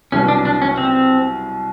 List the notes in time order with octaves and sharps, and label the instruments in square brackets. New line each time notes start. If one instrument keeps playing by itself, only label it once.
[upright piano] C2 B2 F#3 [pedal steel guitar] C#4
[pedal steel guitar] D4
D4
C#4
C4